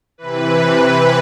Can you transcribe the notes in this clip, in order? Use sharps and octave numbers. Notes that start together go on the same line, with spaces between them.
C3 E3 B4
B4